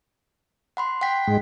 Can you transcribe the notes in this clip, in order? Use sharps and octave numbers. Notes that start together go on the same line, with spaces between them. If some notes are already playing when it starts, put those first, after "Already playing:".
F#5 B5 C6
F#5 G5 B6
G#2 G#3